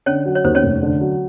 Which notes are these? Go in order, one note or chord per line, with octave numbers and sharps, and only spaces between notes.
D3 C#4 C#5
F#3
C#5
D#2 C5
C#4 C#5
F1
D3
F#3